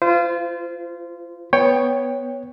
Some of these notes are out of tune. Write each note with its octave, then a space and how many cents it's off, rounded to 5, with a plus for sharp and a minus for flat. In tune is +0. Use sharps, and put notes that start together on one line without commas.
F4 -20 C5 -30
B3 +0 C#5 +0 G5 +15